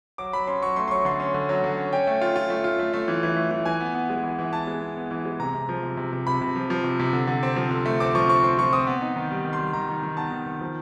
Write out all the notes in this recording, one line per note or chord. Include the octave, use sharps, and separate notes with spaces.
F#3 D6
F#3 B5
C#4 C6
F#3 C#6
A3 C6
C6
F#3 C#6
D3 C6
C#4
D3
F#3
D3
C#4
C#4 G5
A3
F4
F4
A3
F4
A3
A3
E3
E3
A3
E3
E3 G#5
B3
B3
G#3
E3
E3
B3 A5
G#3
B3
B3
E3
G#3
C3 A#5
C3
F3
C3
C3
C3
C3 B5
C3
F3
F3
C3
C3
D3
D3
C4
F3
D3
A3
C4 D6
F3 C#6
C4 C#6
C4 C6
F3 C#6
C4 D#6
B3
D#4
D#3
G3
D#3
C6
G3
D#3 A#5
D#3
D#3
B3 A5
D#3
D#3
F3